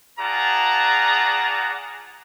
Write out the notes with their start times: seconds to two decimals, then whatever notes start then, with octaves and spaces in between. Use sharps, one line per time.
0.19 F4 G#4 D5 F#5 A5 A#5